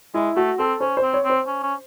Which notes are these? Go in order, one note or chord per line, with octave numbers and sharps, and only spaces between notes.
G#3 E4
A3 F#4
C4 A4
C#4 C5
C5
C4
C#5
C4
C5
C#4
C#4